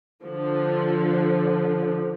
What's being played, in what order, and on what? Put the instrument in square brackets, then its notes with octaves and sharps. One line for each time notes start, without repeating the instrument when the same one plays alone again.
[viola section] D3 F3